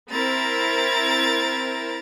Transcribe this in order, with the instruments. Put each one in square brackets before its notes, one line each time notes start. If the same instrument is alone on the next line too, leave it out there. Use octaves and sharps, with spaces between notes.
[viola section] C4 E4 A#4 [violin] A#5 A6